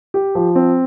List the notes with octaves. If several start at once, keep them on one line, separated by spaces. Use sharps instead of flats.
G4
F3
C4